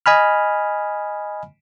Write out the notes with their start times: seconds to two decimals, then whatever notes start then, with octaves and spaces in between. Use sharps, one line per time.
0.06 D#5 G#5 B5 F6